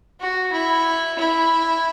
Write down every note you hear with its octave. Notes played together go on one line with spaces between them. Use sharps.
F#4
E4
E4